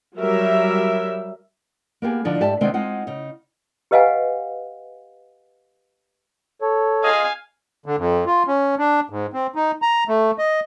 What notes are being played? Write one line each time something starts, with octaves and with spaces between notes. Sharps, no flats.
F#3 G3 A#4 E5
A#3 B3 G4 G#4
D3 F3 D4 D#4
G#2 G4 D5 E5 A5
C3 D#3 G#3 B3 C4 D4
G#3 C4 D#4 F4 F#5
C#3 D#4
G4 B4 D#5 F5 F#5 G#5
A4 C#5
F4 G#4 D#5 F5 G#5
D3
F2
F4
C#4
D4
G#2
C4
D#4
A#5
A3
D#5